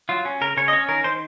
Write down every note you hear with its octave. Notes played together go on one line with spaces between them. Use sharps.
F#3 F4
C#4
C#3 A#4
C#3 C#5
D#5
C#4 C#5
D#3 A#4
D#3 C5